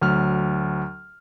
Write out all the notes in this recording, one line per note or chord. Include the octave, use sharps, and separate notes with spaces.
D2 F#3 F6